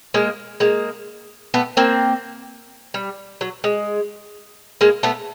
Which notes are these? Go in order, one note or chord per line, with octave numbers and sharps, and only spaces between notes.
G#3 A#3
G#3 A#3
A3 B3
A#3 C4
G3
F#3
G#3
G#3 A#3
A3 B3